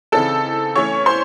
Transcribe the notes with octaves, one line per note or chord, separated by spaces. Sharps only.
C#3 E3 C4 D#4 A4 A5
E3 A3 C#4 C#5 C#6
C5 C6